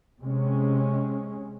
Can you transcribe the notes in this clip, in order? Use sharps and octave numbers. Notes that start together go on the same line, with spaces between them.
C3 G#3 C#4